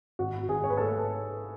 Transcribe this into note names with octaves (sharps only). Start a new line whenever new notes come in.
G#1 F#4
G#1 G#4
C#5
B4
A3 A4